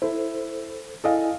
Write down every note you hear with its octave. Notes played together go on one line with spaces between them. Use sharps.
E4 A4 C5
E4 A4 D#5 F5 G#5